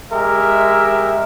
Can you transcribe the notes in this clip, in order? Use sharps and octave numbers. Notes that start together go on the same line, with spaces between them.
G#3 G4 A#4 E5